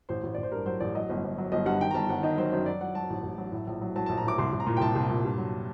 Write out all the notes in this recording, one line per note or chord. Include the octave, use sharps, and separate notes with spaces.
A1 C5
A1
A1 D5
C5
G2 A#4
F#3 C5
A1 D5
F#3 D#5
G1
G1
F#3
G1 D#5
G2 F#5
D#3 G5
A#5
G1 A5
G1 F#5
D#3 D#5
F#3 C5
F#2 C5
F#3 D5
F#3 F#5
F#3 A5
A1
A1
F#3
A2
A#1
F#3
F#3 A5
A#1 A5
A#5
A2 D6
C2 C6
C2
A#5
A#2
G5
C2 A5
C2
A#2
G2
F#3